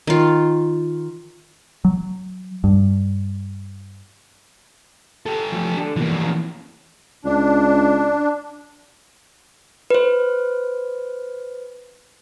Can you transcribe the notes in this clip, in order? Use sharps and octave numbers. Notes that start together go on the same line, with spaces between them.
D#3 F4
F#3
G2
G4 A4
F3 F#3 A3
D4 A4
F2 B2 E3 A#3
A#2 F3 C#4
C#2 D4
B4 C5